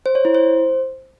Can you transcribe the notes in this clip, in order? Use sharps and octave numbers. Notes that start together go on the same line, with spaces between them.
C5
C#5
E4
C5